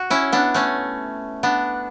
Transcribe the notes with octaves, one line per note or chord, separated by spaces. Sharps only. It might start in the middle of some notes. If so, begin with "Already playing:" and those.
Already playing: F#4
C#4 E4
B3 D4
A3 C#4
B3 D4